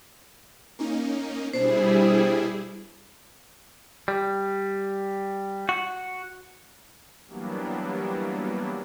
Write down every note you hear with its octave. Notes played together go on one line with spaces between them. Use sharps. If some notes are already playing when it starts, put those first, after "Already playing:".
A#3 C#4 D#4
B2 G3 D4 E4 G#4 C5
G3
F#4
E3 F#3 G3 A#3 B3 D4